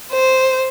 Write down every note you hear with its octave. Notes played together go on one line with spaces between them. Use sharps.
C5